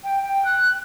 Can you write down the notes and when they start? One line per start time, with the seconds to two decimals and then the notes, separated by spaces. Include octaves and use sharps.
0.04 G5
0.23 G5
0.45 F#6